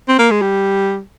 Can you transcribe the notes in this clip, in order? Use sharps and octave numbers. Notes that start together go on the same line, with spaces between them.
C4
A#3
G#3
G3